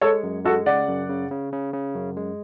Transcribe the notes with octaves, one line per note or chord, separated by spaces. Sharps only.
G#3 A4 C#5
F#2
G#3 F#4 A4
C#3 D5 F#5
F#2
C#3
C#3
C#3
C#3
F#2
G#3